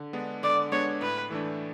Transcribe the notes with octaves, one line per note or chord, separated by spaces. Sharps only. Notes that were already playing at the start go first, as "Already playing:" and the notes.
Already playing: D3
G#3 B3 D4
D3 D5
G#3 B3 D4 C#5
A2 B4
E3 A3 D4